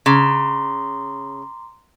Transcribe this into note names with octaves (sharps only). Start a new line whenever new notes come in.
C#3 A#5 C6 D6